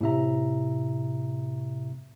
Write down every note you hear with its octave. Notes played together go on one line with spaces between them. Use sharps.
A2 C3 E5 A#5